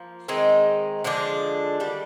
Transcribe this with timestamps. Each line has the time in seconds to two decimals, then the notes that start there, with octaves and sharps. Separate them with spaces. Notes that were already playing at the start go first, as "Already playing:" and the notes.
Already playing: F3 A#3
0.28 D#3 G#3 C4 D#4
1.04 D3 F3 G#3 D4
1.80 D#3 G3 D4